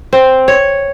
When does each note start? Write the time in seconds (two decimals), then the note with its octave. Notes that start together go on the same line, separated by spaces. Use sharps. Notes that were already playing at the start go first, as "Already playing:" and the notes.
0.13 C4
0.48 C#5